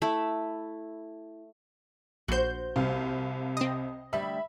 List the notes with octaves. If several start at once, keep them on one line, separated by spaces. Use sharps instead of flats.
A3 E4 B5
A#1 F#4 C5 G6
C2 C3 F5
C4 D#5
D2 G3 E5 B5